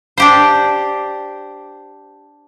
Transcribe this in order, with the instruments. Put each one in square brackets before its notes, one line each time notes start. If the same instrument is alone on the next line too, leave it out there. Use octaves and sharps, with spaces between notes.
[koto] D4 G4 C5